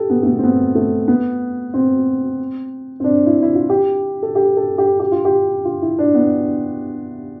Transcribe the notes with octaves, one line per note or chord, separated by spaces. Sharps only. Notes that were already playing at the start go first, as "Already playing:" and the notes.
Already playing: G4 A4
B3
A3
B3
C4
B3
A3
B3
C4
C4
D4
E4
E4
F4
G4
A4
G4
A4
G4
G4
F4
G4
F4
E4
D4
B3